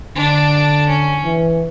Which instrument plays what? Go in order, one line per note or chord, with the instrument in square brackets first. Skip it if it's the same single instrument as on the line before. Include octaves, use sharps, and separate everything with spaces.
[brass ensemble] D3 [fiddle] D4
[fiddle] C#4
[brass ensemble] E3